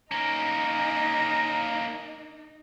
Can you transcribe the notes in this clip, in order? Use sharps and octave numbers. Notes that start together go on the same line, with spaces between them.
A#3 C#4 D#4 A#5